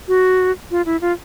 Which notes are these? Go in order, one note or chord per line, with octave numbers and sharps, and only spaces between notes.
F#4
F4
E4
F4